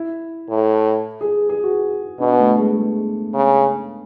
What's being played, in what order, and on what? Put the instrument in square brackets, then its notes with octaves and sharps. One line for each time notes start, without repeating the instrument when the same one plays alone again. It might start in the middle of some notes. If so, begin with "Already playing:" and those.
Already playing: [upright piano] E4
[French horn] A2
[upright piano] G#4
G#4
F#4
[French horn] B2 [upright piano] D4
[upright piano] B3
A3
G#3
G#3
[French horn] C#3